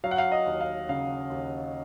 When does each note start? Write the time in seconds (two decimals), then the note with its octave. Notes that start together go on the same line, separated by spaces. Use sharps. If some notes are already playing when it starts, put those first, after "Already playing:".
0.04 F#3 F5
0.11 F#5
0.18 F5
0.32 D#5
0.46 D#2
0.61 F5
0.89 C#3 F5
1.30 D#2